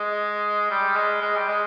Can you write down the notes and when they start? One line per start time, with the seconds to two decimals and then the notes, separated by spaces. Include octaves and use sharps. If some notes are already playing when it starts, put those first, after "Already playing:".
Already playing: G#3
0.70 G3
0.96 G#3
1.22 G#3
1.36 G3
1.48 G#3